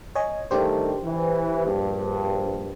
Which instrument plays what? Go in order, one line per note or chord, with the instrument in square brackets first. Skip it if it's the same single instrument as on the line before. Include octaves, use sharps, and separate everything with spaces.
[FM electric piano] C#5 D#5 G#5
[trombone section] D#3 G3 A3 [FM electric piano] D4 G4 C5
[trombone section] E3
A#1 G2